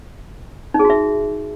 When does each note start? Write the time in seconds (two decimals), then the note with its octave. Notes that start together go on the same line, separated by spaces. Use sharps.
0.74 D#4
0.79 G#4
0.85 F#4
0.90 E5